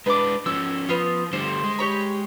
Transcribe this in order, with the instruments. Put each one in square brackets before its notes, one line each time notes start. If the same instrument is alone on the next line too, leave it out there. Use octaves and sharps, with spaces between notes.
[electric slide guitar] G#3 D4 [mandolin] B4 D6
[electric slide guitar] F3 C#4 [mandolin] E6
[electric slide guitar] F3 [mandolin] B3 F4
[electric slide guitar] D3 G3 A3 [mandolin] C5
[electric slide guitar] G#3
[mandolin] G4 C#5 B5